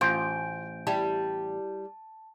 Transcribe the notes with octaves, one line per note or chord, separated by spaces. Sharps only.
A1 F4 C5 G6 D7
G3 E4 G4 A5